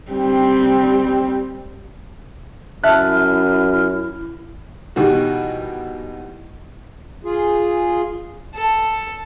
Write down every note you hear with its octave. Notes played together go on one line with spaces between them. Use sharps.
G3 C4
F#2 E4 E5 A5 F6 F#6
B2 D#3 E3 G3 F#4
F4 G#4
A4